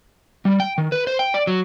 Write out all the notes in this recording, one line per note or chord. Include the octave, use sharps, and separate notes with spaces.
G3
G5
D#3
B4
C5
G5
D5
F#3